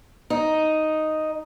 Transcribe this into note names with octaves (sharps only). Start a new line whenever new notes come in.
D#4